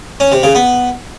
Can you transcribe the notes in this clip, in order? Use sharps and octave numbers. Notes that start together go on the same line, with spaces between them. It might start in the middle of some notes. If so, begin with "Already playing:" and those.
C#4
C3
C#3
B3